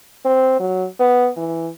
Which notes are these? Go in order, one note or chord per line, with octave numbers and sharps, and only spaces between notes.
C4
F#3
B3
E3